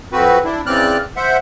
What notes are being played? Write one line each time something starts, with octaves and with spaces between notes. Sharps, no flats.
F2 C4 F#4 B4
D4 E4
C#3 E3 C4 D5 F6 F#6
C5 E5 F#5